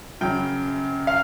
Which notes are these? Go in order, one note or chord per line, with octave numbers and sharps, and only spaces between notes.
F#2 C#3 F#3 G5
F5